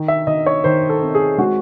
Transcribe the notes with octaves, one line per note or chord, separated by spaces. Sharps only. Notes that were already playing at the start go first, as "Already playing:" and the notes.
Already playing: D#3
E5
D#3 D#5
C#5
D#3 C5
A4
C4
G#4
G#3 F#4